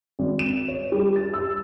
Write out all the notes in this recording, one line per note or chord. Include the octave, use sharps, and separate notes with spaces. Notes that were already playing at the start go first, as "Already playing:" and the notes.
G#1
E7
C#5
G3
A6
E6